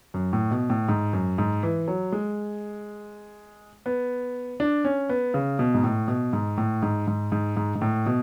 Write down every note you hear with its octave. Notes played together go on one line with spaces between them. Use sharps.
F#2
A2
B2
A2
G#2
F#2
G#2
E3
F#3
G#3
B3
D4
C#4
B3
C#3
B2
G#2
A2
B2
G#2
A2
G#2
G#2
G#2
G#2
G#2
A2
B2